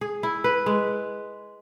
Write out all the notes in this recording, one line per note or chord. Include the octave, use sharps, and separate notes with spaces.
G#4
E4
B4
G#3